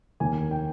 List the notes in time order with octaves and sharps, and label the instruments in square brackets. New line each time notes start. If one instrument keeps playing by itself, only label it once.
[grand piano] F1 D#2 D#3 A#3 G#5
G5